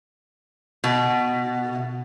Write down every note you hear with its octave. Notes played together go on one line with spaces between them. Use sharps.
B2